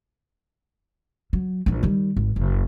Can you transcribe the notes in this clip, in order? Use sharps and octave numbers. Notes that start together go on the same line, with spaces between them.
F#3
A#1 E3
D#3 G3
G#1
F#1